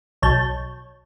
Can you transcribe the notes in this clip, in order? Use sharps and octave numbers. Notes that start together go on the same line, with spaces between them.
B1 C#5 A5 G6